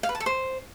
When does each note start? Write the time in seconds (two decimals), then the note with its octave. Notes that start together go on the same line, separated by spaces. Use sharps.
0.03 F5
0.09 B4
0.15 A5
0.20 A4
0.26 C5